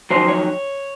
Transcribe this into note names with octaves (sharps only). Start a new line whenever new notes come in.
F2 D#3 F#3 C5
C#5